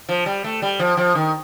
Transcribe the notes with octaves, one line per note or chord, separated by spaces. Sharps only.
F3
G3
A3
G3
F3
F3
D#3